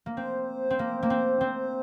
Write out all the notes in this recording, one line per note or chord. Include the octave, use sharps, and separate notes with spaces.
A#3
C4 C5
C4
A#3
A#3
C4
C4